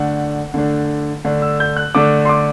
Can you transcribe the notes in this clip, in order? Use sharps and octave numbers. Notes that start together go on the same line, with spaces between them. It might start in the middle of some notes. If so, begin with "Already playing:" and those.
Already playing: D3 A3 D4 F#5
D3 A3 D4
D3 A3 D4
E6
G6
F#6
D3 A3 D4 D6
C6
D6